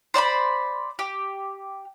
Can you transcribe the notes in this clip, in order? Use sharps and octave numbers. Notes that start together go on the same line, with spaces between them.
C5 D5 A#5 B5
G4